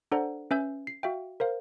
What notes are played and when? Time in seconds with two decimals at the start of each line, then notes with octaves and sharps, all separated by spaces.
0.12 D4 A4 C5 D5 F#5 A#5
0.51 C#4 B4 E5 G#5 E6 G6
0.87 C7
1.03 F#4 E5 F5 G5
1.40 A#4 C5 F5